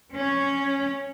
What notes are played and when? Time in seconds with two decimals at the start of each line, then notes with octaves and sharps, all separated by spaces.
0.16 C#4